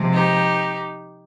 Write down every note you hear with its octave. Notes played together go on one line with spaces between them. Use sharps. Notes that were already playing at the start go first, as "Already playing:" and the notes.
Already playing: C3 F3 G#3
D#4 G4